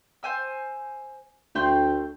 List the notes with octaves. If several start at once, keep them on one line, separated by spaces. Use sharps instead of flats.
C5 G#5 E6
D2 A3 G5 C6